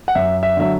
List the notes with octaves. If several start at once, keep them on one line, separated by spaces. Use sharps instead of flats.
F#5
F#2 E5
E5
D3 F#3 E5